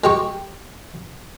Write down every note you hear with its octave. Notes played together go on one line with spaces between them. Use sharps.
G#3 G4 C#6